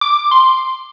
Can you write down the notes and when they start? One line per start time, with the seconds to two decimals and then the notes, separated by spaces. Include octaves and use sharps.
0.01 D6
0.31 C6